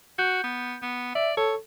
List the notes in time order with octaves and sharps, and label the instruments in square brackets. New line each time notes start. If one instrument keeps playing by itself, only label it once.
[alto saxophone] F#4 [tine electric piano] G6
[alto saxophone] B3
B3
[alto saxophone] D5 [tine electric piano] E5
[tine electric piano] A4 [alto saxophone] C#5